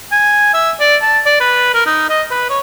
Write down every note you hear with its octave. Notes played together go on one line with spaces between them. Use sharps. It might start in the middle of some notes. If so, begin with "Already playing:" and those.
G#5
E5
D5
A5
D5
B4
A#4
D#4
D#5
B4
C#5